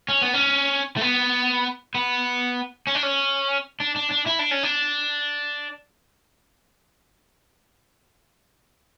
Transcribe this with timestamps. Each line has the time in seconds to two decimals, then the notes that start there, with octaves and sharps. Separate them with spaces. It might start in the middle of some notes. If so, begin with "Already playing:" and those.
0.09 C#4
0.22 B3
0.34 C#4
0.97 A3
1.01 B3
1.95 B3
2.87 C#4
2.95 D4
3.03 C#4
3.80 D4
3.96 D4
4.11 D4
4.26 E4
4.39 D4
4.51 C#4
4.63 D4